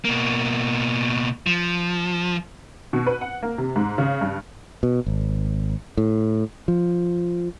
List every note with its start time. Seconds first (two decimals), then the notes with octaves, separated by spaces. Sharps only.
0.05 B2 A#3
1.47 F3
2.93 B2
3.07 B4
3.21 F#5
3.43 A#3
3.58 C3
3.76 G#2
3.98 C#3
4.21 G2
4.83 B2
5.06 G#1
5.97 A2
6.68 F3